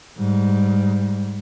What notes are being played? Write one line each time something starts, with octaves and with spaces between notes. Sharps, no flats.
G#2 G3